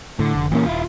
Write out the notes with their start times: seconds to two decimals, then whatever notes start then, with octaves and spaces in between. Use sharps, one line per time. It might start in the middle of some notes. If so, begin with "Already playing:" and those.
0.19 A2 D3
0.35 F1
0.52 A#2 E3 A3 A#3 C#4
0.66 D#1 E4 F4